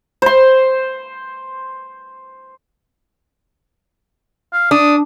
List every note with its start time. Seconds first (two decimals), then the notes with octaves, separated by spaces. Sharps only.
0.22 C5 C6
4.53 F5
4.71 D4 D#6